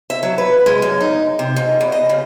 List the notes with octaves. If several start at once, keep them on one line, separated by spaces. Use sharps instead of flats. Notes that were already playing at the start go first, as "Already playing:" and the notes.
E5
F#3
B4
G#3
F#2
D#4
C3
G#2
E2
D#5
C#3